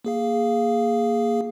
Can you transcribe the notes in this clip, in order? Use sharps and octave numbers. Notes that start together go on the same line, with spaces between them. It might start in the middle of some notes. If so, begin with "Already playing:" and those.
A#3 G#4 F5